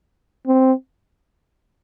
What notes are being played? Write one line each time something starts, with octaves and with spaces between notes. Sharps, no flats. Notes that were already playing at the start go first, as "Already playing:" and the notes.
C4